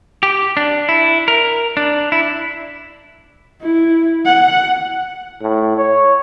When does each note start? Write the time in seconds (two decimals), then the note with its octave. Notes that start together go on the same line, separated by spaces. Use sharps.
0.23 G4
0.57 D4
0.89 E4
1.28 A#4
1.77 D4
2.12 E4
3.62 E4
4.26 F#5
5.42 A2
5.77 C#5